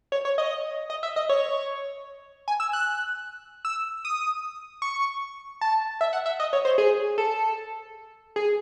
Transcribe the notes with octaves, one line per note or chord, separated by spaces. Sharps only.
C#5
C#5
D#5
D#5
E5
D#5
C#5
G#5
E6
F#6
E6
D#6
C#6
A5
E5
F#5
E5
D#5
C#5
C5
G#4
A4
G#4